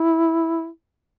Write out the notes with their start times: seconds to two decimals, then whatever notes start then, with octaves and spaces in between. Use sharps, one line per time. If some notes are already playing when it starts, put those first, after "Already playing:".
Already playing: E4